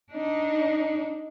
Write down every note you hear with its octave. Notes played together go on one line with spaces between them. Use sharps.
D4 D#4